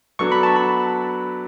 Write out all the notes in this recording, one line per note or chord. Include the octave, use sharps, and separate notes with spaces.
F#3 B3 D4 F#4 A4 C#6
B5
A5
B5